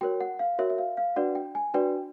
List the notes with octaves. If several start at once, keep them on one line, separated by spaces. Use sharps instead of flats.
F#4 A#4 C#5 G5
F#5
F5
F#4 A#4 C#5 E5
E5
F5
F5
D4 F#4 B4 D5 F#5
G5
G#5
D4 F#4 B4 D5 G5